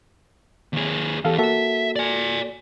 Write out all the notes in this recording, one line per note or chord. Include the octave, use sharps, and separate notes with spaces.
D#2 G#4
E2 G4 A4 F5
A#3 F#4 A4 E5
D5 G#5